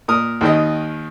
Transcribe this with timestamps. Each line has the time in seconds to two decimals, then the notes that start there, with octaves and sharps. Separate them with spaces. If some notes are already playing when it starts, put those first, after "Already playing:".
0.08 A#2 A#4 D#6
0.41 D#2 D#3 D#5